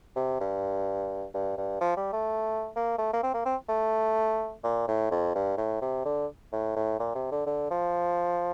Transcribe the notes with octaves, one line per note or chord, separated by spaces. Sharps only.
C3
G2
G2
G2
F3
G3
A3
A#3
A3
A#3
C4
A#3
C4
A3
A#2
A2
F2
G2
A2
C3
D3
A2
A2
A#2
C3
D3
D3
F3